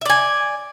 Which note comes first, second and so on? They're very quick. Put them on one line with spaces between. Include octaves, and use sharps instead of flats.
E5 D5 G#5